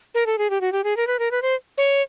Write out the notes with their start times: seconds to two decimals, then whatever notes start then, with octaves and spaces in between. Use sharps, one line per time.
0.15 A#4
0.26 A4
0.38 G#4
0.50 G4
0.61 F#4
0.72 G4
0.84 G#4
0.97 A#4
1.07 B4
1.19 A#4
1.31 B4
1.42 C5
1.78 C#5